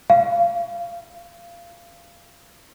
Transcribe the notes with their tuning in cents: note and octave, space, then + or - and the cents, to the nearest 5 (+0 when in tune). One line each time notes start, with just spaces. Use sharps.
F5 -20